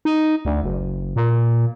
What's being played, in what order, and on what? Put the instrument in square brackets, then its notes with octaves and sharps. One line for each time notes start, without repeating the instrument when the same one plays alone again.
[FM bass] D#4
D2
F#1
A#2